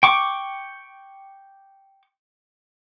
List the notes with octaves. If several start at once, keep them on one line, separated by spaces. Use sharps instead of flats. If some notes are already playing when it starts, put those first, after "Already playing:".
G5 C#6 D6